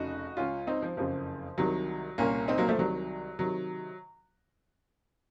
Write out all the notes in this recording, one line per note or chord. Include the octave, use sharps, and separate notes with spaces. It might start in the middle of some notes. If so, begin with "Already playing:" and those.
Already playing: F1 C#3 D#4 F#4
C#2 C#3 C#4 F4
C4 D#4
F3
F#1 F2 C#3 F3
C2 C3 D#3 F#3
C2 A#2 A#3 C#4
C4 D#4
F#3 A#3
F3 A3
C2 C3 D#3 F#3
C3 D#3 F#3